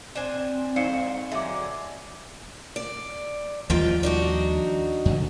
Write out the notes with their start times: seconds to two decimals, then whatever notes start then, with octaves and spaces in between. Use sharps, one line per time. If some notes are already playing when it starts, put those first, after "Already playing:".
0.15 C4 D4 C5 G#5
0.76 G2 C5 D5 F5 C#7
1.32 D3 F#3 G#3 E5 D6
2.76 D5
3.70 D#2 G#2 F3 G3 F4 G5
4.03 D4 D#4 F#4
5.05 F2 D3